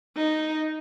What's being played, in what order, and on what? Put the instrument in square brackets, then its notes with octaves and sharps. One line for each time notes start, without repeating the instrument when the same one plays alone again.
[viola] D#4